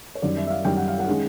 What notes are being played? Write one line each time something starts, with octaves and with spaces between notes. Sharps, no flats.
C#5
F#2 D#3 G3 D5
E5
E5
F5
F#2 D#3 G3 G5
F#5
F5
F#5
D#3 G#3 C#4